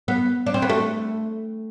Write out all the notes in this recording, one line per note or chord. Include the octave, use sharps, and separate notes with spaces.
B3
D4
C4
B3
A3